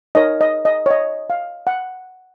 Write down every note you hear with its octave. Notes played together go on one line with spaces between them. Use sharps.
D#4 A#4 C#5 D#5
D#5
D#5
C#5
D#5
F5
F#5